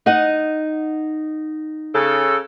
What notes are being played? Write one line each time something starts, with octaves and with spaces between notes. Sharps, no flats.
D#4 D#5 F#5
C#3 A4